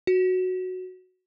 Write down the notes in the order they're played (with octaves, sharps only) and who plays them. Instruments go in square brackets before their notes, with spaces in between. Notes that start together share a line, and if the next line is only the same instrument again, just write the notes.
[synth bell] F#4